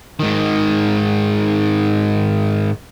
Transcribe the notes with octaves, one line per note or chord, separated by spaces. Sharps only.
G#2 D#3